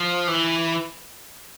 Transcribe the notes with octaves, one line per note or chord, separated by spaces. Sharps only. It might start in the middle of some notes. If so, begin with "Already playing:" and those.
Already playing: F3
E3